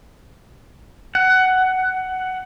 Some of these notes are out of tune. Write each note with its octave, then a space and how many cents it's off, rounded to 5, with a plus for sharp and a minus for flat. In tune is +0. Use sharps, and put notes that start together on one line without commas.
F#5 +15